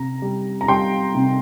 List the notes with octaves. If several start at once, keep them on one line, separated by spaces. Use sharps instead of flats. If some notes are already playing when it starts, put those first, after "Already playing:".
Already playing: C3 A#5
G3
A#5
G3 G5 C6
C3